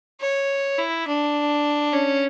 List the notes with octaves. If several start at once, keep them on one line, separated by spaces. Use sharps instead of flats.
C#5
E4
D4
C#4